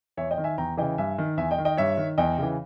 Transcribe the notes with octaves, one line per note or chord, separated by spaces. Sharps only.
E2 C#5 E5
D#5 G5
D#3
E5 G#5
E2 G5 A#5
C#3 E3 D#5 G5
G2 E5 G#5
D#3
E2 E5 G#5
D#5 G5
D#3
D#5 G5
G2 C#5 E5
D#3
E2 D#5 G5
C#3 E3